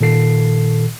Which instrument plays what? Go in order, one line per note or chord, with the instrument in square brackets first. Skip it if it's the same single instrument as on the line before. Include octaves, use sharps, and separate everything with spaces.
[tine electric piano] A#2 D#3 A4 C7